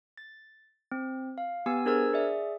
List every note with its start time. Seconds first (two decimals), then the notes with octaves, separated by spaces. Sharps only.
0.18 A6
0.92 C4
1.38 F5
1.66 B3 G4 G#5 E6
1.86 D4 G#4 A#4 C5 E6 G#6
2.13 G#4 D5 E5